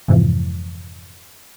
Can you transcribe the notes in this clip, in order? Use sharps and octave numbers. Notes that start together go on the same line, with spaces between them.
F2 G#2 C3 E3 F3